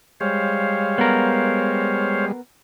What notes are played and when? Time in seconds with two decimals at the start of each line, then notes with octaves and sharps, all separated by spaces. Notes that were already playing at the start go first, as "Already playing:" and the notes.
0.20 G3 G#3 C5 C#5 F5
0.98 B3 A#4